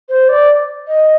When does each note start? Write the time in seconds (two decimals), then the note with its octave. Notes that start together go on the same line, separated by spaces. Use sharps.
0.09 C5
0.29 D5
0.88 D#5